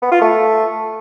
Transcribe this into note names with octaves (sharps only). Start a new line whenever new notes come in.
B3
F4
A3